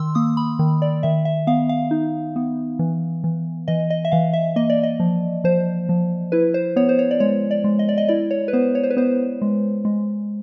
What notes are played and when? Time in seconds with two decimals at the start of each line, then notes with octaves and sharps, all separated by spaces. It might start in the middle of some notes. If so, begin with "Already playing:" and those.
Already playing: D#3 C6 E6
0.15 A#3 D#6
0.37 B5
0.59 D#3
0.82 D5
1.03 D#3 E5
1.25 E5
1.47 B3 F5
1.69 F5
1.91 D#4
2.36 B3
2.79 E3
3.24 E3
3.68 E3 D#5
3.90 D#5
4.05 E5
4.12 E3 F5
4.33 E5
4.56 A#3 D#5
4.70 D5
4.83 D#5
5.00 F3
5.44 F3 C5
5.89 F3
6.32 E4 B4
6.54 C5
6.76 B3 C#5
6.89 C5
6.99 C#5
7.11 D5
7.20 G#3 C#5
7.51 D5
7.64 G#3
7.79 D#5
7.89 D5
7.98 D#5
8.08 E4 D5
8.31 C#5
8.48 B4
8.53 B3 C5
8.75 C#5
8.83 C5
8.90 B4
8.97 B3 C5
9.42 G#3
9.85 G#3